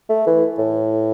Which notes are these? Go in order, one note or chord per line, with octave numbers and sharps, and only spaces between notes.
A3
E3
A2